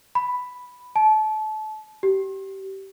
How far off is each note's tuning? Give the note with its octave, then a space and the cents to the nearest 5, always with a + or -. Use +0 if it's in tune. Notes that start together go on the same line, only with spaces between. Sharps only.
B5 +5
A5 -30
G4 -20